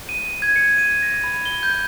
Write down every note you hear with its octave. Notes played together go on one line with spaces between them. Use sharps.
D#7
G#6
C#7
D#7
A#6
B5
G7
G6